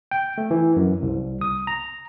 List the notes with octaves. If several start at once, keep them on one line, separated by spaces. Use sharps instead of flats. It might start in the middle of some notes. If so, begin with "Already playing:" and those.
G5
A3
E3
F#2
C2
D#6
A#5